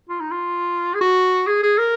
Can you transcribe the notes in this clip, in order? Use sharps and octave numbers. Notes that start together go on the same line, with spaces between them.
F4
D#4
F4
G#4
F#4
G#4
G#4
A#4